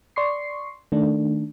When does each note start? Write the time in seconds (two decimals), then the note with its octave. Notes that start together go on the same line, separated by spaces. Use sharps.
0.16 D5 C6 C#6 C7
0.92 D#3 A3 D4